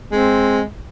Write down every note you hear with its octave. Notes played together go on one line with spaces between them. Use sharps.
G#3 C4